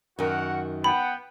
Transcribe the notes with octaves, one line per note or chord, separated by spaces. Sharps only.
F#2 D#3 F#4 A#4 F#5
B3 F#5 G5 B5